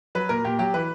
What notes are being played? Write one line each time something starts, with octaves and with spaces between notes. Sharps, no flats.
F#3 B4
A#2 A#4
A#2 G4
F#3 G4
E3 B4